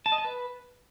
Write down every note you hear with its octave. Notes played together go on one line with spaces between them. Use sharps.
A5
D#5
A5
B4